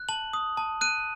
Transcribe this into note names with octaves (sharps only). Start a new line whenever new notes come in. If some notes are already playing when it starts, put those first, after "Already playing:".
Already playing: F#6
A5 F#7
D#6
A5
F#6 D#7